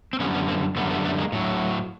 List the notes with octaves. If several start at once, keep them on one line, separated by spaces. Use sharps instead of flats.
C4
F#2 D3 G3 B3 C#4
B3 C#4
A#3 C4
F#2 D3 G3 A3 B3
A3 B3
A3 B3
G#3 A#3
A2 F#3